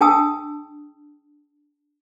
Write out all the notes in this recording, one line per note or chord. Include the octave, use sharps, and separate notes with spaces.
D4 G#4 G5 A5 D#6 E6